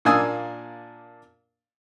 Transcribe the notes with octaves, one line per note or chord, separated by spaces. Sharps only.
A#2 A#3 D4 G#5 D#6 E6